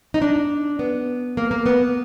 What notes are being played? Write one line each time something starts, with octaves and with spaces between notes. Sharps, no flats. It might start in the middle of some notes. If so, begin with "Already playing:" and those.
D#4
D4
B3
A#3
A#3
B3